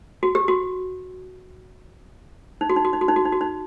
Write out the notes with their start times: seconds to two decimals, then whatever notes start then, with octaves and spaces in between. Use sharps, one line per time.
0.23 F#4
0.35 G4
0.48 F#4
2.61 D#4
2.70 F#4
2.76 D#4
2.85 F#4
2.93 D#4
3.01 F#4
3.08 D#4
3.16 F#4
3.25 D#4
3.32 F#4
3.41 D#4